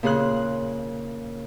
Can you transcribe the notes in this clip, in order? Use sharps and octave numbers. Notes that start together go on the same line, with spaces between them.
A#2 C#3 G#4 C6 F#6